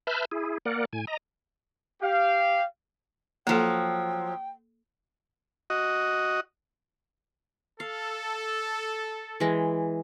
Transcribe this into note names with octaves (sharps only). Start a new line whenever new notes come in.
B4 E5 A5 B5 F6 G6
E4 G#4
A#3 A#4 D5 F#5
A2 G#5
D#5 A#5
G4 F5
F3 F#3 A#3 A4 G5
F#4 D#5
A4 F5
E3 G#3